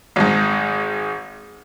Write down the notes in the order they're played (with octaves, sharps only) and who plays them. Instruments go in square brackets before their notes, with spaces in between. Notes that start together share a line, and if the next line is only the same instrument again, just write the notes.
[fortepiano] G#1 G#2